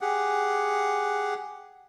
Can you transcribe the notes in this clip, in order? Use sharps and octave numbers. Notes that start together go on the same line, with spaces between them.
G4 G#4 F#5